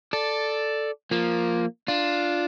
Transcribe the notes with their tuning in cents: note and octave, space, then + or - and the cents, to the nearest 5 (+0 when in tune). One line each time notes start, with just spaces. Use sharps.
A4 +0 D5 +0
F3 +0 A#3 +0
D4 +0 F4 +0